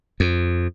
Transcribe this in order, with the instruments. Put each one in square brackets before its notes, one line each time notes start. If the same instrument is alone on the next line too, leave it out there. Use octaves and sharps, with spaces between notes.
[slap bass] F2